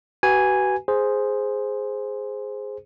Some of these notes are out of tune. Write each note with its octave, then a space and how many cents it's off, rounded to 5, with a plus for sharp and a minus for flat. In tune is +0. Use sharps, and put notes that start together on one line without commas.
F#4 +40 B4 +0 G#5 -5
G#4 +0 C5 +0